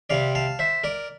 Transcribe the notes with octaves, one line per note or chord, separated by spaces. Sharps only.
C3 G3 C4 D5 F5
F5 A5
C5 E5
A#4 D5